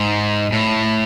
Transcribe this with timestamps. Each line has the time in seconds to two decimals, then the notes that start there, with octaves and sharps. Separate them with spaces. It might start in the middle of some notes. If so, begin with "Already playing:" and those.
Already playing: G#2
0.52 A2